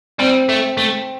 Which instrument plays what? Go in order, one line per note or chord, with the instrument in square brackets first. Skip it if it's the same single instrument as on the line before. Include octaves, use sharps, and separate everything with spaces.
[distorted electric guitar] G3 [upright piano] C4
[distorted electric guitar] A3
A3